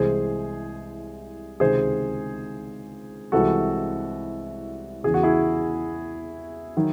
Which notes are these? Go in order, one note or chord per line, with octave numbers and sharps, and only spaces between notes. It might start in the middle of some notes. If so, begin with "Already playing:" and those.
Already playing: C2 C3 E3 G#3 G#4 C5
C#2 C3 D#3 G#4 C5
C2 C3 E3 G#3 F#4 A4
E2 C#3 E3 G#4
F#4
E4 G#4
D#3 F#3